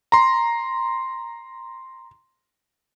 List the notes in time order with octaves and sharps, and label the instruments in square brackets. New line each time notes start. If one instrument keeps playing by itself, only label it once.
[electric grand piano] A#5 C6